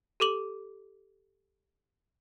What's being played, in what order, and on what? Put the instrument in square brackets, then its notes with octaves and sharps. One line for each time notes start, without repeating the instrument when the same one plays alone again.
[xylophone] G4 A4 D6 F#7